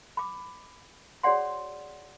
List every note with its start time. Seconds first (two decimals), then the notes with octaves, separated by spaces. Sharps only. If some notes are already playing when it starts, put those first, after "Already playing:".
0.17 B5 D6
1.23 F#4 G#4 C#5 D5 F#5 C6